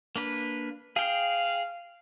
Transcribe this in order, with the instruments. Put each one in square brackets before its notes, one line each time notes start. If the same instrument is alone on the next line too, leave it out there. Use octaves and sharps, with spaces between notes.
[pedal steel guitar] A#3 D4 B4
[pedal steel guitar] G#4 G5 [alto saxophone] F5